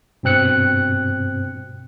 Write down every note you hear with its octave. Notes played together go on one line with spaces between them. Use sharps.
G2 B2 C4 F#6 C#7